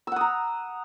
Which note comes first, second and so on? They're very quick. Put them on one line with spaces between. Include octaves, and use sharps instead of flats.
E6 F#5 D#6 A#5